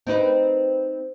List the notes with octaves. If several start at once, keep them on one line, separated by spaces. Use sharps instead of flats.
C4 D#4 B4